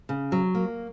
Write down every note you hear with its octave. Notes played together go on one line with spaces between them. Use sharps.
C#3
F#3
A#3